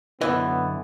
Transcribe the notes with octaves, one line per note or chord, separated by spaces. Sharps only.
F#2 D3 E3 B3 D#5